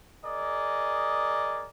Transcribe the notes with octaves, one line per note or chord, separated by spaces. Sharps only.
G#4 A#4 D5 D#5